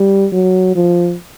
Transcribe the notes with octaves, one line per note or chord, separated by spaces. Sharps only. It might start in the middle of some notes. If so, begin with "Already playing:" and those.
Already playing: G3
F#3
F3